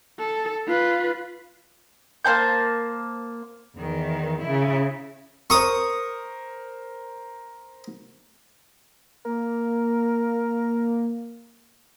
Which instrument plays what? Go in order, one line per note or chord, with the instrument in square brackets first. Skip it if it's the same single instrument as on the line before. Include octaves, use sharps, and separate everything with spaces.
[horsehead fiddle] A4
F4 B4
[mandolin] A#3 C5 A5 G6
[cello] E2 D#3
C#3 E4
[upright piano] A#4 C5 [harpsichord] C#6 D#6
[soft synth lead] A#3 [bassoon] A#4